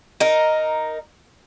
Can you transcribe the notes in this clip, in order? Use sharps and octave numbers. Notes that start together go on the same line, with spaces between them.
D#4 A#4